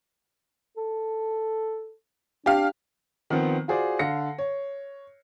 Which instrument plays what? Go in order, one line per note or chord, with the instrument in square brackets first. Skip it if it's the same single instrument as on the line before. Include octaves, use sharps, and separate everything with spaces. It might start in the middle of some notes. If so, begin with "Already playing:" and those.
[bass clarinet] A4
[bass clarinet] D4 [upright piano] G4 F5
[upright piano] D#3 F3 B3 C4
F4 F#4 G#4 C5 D5
D3 F5 A#6 C#7
C#5